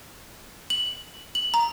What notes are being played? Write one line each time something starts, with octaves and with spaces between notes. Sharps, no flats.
F#7
F#7
A#5